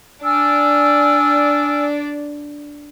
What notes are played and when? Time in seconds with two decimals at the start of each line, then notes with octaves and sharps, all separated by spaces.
0.23 D4 D5 G#5 E6 F6